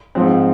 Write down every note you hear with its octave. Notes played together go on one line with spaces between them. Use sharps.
G#2 F3 C4